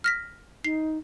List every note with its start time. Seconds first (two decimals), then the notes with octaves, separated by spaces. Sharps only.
0.04 F6 A#6 B6
0.64 D#4 C7